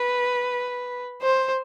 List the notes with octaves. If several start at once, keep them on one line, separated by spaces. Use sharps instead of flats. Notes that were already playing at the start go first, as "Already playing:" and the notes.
Already playing: B4
C5